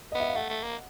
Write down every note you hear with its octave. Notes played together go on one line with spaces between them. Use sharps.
D#5
B3
E5
F5
A3 F#5
A3
A#3